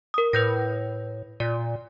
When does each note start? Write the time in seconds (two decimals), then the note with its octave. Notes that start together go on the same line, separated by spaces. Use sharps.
0.14 A#4 D#6
0.33 A2 B4 G6 A#6
1.40 A#2 D5